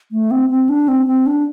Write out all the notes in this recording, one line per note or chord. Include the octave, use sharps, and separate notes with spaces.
A3
C4
C4
D4
C4
C4
D4